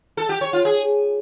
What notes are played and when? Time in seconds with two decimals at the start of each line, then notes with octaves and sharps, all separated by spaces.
0.17 A4
0.29 G4
0.41 C#5
0.53 F4
0.65 G#4